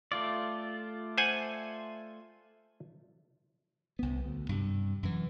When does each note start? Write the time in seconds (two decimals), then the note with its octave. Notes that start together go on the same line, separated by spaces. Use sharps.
0.12 A3 F4 D5
1.18 C5 F#5 G#5
3.99 C2 B3
4.24 D2
4.49 G2 C3
5.03 F#2 E3